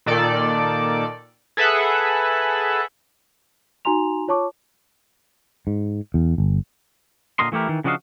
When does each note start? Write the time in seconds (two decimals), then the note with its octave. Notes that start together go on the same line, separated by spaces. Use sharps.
0.06 A#2 D#3 A4 D5
1.57 G#4 A4 B4 E5 F#5 F#6
3.85 D#4 F#4 G#5 A#5 C6 F7
4.28 F4 C#5 A5 C#6 D6
5.67 G#2
6.14 E2
6.38 G1
7.39 A#2 D3 A#4 D#5 C6
7.52 E3 A3 E4 G4 A#4
7.69 D#3 E3
7.84 C#3 F3 D4 F#4 D#5 F5